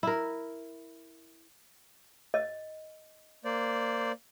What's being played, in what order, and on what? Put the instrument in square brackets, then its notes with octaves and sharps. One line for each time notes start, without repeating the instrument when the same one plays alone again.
[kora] E4 A#4
[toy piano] D#5
[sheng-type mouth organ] A#3 C5 D5